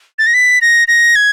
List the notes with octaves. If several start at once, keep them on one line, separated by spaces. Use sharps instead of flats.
A6
A#6
B6
A#6
A#6
G#6